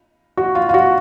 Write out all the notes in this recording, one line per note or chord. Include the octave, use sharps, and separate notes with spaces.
F#4
F4
F4
F#4